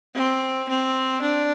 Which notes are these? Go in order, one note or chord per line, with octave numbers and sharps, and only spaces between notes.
C4
C4
D4